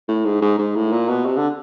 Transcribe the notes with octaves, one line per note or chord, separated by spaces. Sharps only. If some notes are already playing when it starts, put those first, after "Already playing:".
A2
G#2
G#2
G#2
A2
A#2
B2
C3
D3